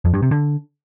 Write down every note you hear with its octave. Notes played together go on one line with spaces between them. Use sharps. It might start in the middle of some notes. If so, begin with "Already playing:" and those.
F2
G2
C3
D3